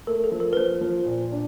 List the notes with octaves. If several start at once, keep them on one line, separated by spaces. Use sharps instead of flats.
A3 A#4
A4
F3
A#4
B4
F3 C5
F3
A#2
D4